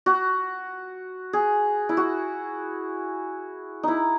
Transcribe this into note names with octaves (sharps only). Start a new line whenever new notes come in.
F#4
G#4
E4
F#4
D#4 E4